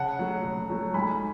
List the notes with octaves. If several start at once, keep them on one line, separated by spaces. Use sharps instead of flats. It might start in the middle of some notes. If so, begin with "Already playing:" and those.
Already playing: C#3 F#5 A5
F#3 A3
C#3
F#3 A3
G#2 G#5 B5